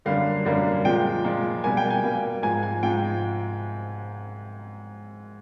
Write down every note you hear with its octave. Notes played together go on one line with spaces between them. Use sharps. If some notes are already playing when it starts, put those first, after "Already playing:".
F#2 D3 G3 A#3 F5
F#2 D3 G3 A#3
A#2 F3 G#3 G5
A#2 F3 G#3
B2 G3 A#3 G#5
G5
G#5
B2 G3 A#3
G#2 F3 G#3 G#5
G#5
G#2 F3 G#3 G5